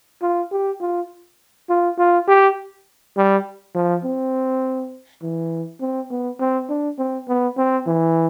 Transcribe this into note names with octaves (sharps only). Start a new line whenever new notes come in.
F4
G4
F4
F4
F4
G4
G3
F3
C4
E3
C4
B3
C4
D4
C4
B3
C4
E3